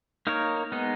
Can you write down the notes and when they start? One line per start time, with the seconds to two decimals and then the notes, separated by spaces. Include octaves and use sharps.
0.27 A#3 D#4 A#4 C#5
0.72 G#3 B3 D#4